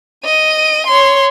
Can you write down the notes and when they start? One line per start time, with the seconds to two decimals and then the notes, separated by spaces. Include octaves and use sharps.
0.25 D#5 D#7
0.87 C#5 C6